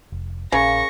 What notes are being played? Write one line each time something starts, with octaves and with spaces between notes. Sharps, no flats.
F1
A#1 C#3 A#3 C#4 C#6 A#6